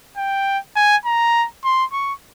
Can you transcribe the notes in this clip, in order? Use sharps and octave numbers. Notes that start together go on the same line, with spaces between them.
G5
G#5
A#5
C6
C#6